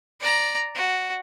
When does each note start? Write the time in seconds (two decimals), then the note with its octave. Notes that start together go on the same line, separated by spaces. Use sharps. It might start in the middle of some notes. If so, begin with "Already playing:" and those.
0.21 D5 A#5
0.75 F#4